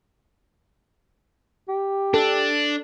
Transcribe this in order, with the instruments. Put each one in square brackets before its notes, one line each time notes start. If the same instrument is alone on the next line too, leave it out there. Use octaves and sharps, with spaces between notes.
[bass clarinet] G4
[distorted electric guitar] D4 [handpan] A4